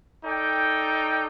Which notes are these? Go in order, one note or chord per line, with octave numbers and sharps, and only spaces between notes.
D#4 A4 D5 G5